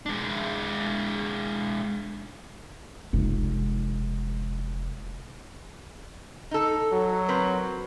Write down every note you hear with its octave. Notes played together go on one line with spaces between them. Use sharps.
G#3 D4
F1 G#3
D#4 A4
F#3
C4 A#4 B4